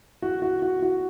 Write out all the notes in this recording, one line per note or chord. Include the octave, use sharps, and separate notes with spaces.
F#4
F#4
F#4
F#4